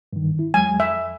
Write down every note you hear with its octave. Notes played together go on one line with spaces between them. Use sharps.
G2 D#3
E4
E2 F#3 G#3 G#5
F2 E5